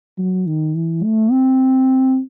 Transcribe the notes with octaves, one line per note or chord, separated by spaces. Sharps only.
F#3
D#3
E3
A3
C4